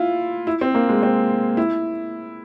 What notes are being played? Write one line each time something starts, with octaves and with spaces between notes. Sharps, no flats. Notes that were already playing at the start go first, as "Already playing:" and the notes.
Already playing: E4 F4
E4
C4
A#3
G#3
C4
E4